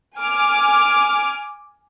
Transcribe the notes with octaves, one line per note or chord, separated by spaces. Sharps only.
G#5 D6 F6